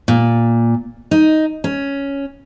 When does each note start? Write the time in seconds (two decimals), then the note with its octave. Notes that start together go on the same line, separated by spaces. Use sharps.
0.08 A#2
1.11 D#4
1.64 C#4